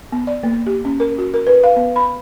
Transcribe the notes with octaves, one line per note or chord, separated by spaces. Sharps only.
B3
D5
A#3
G4
C#4
A#4
F#4
A#4
B4
F5
B3
B5